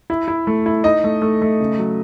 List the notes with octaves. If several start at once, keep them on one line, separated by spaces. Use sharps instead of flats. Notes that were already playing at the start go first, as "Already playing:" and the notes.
E4
E4
A3
E4
D#4 D#5
A3
A3
A3
C#3
F#3